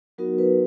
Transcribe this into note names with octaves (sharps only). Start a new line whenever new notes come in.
F#3 B3 D#4 F#4 A#4
B4